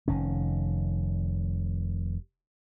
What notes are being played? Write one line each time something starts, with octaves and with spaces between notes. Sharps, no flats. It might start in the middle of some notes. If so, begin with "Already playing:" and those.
F1 D#3 C#4